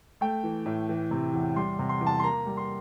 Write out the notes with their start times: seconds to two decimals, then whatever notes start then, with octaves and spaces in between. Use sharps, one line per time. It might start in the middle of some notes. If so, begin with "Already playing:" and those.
0.21 A3 G5
0.44 E3
0.66 A2
0.89 E3
1.11 C3
1.33 E2
1.56 G3 C6
1.79 C3
1.89 C6
2.01 E2
2.07 A5
2.20 C6
2.23 A#3 A#5
2.46 G3
2.57 C6